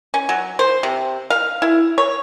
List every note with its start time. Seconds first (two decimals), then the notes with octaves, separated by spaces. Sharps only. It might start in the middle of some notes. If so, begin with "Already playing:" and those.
0.14 C#4
0.29 F#3
0.59 C5
0.83 C3
1.30 F5
1.62 E4
1.98 C#5